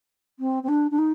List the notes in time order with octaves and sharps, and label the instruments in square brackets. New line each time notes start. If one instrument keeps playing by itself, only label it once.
[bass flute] C4
C4
D4
D4
D#4